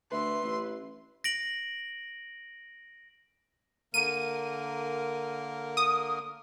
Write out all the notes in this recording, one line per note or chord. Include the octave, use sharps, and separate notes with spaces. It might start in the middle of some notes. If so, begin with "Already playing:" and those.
D2 B4 E5 C6
A1
A#6 D7 F#7
D3 A#3 A#4 D#7
D#6